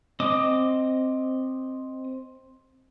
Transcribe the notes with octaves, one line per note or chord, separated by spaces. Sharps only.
C4 D#5 D6 D#6